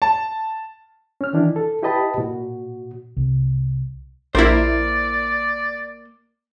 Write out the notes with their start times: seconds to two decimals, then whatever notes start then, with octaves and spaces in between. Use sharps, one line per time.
0.02 A5
1.21 C#4 F6
1.33 D#3 E3 D4 E4
1.56 A4
1.83 E4 G4 B4 D#5 A5 B5
2.18 A#2 F#4
3.17 C2
4.35 A#1 A#3 E4 A#4 C5 D5